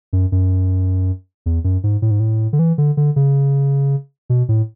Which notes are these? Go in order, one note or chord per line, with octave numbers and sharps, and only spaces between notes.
F#2
F#2
E2
F#2
G#2
A2
G#2
A2
D3
E3
D3
D3
C#3
B2
A2